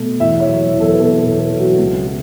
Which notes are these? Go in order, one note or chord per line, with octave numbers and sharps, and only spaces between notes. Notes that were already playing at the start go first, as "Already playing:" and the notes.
Already playing: B2 A3
E2 E5
C#5
F#3
E2
A4
B4
B2 A4
A4
E2
A4
F#3
F#4
C#2
F#3